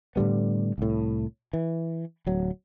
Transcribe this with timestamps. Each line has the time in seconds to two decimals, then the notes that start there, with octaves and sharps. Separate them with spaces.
0.16 A2 D3 G3 B3
0.78 C2 A2
1.53 E3
2.27 D1 F#3